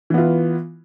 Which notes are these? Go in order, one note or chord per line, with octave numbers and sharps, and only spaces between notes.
E3 B3 E4 F4